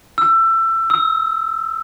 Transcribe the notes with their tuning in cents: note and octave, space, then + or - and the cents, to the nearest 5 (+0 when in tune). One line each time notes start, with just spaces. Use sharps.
E6 +25
E6 -30